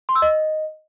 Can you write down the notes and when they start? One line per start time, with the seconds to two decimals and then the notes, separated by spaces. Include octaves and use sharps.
0.09 C6
0.15 E6
0.22 D#5